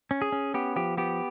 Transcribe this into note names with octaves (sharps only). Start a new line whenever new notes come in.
C#4
G#4
C#4
B3 G4
F3 G4
B3 G4